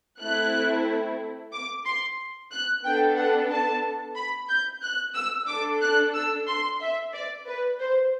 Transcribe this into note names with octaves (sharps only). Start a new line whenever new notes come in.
A3 C4 E4 F#6
D6
C6
F#6
B3 D4 A4 G5
F#5
A5
B5
G6
F#6
E6
D4 A4 D6
F#6
E6
C6
E5
D5
B4
C5